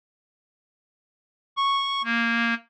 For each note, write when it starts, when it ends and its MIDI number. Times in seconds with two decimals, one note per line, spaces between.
1.57 2.02 85
2.04 2.54 58